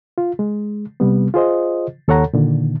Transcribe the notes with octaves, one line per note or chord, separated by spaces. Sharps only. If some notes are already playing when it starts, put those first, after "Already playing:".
F4
G#3
C3 G3 B3
F4 G#4 C5 D#5
D#2 A4 C#5 F#5 A#5
A#2 D3 D#3